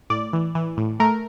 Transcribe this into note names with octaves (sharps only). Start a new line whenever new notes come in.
A2 D5
E3
E3
A2
A3 A#4